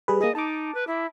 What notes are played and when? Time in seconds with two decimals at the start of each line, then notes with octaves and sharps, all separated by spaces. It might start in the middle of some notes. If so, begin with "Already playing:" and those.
0.08 G3 G#4 B4
0.21 A#3 G#4 D#5
0.35 D#4 A5 D6
0.75 B4
0.87 E4